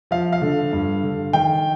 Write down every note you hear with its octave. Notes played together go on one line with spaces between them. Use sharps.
F3 F5
F5
D3
G2
D3
D#3 G5